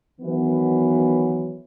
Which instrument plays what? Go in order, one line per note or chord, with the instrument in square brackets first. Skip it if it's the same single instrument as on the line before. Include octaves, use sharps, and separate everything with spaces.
[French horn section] D#3 E3 F#3 B3